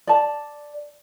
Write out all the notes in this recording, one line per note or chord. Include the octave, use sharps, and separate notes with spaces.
D5 A5